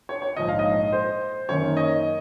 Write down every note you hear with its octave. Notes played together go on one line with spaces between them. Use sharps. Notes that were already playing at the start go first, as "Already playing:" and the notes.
C#5
C#5
A#1 G#2 F3 D#5
F5
D#5
C5
F#2 D#3 A#3 C#5
D#5